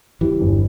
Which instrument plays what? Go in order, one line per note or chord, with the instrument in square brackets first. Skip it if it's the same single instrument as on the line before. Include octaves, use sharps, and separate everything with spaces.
[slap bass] E3 [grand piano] G3
[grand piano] G1